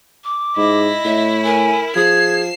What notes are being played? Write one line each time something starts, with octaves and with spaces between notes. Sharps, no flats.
D6
G#2 E4 D#5
A2 E5
A#4 G#5
F3 G#4 G#6 C7 E7